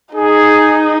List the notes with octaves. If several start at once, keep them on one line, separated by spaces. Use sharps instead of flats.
D#4 G#4